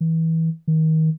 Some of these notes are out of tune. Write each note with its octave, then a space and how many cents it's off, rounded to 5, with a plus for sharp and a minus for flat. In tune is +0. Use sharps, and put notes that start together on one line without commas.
E3 -25
D#3 +30